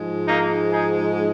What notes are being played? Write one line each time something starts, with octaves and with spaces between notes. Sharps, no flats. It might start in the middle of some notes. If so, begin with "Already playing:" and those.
Already playing: G#2 F3 G#3
A#3 D#4
D#4 G#4